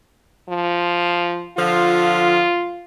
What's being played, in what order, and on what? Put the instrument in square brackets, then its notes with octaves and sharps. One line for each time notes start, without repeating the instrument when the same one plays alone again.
[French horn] F3
[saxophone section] D3 F3 [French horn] F4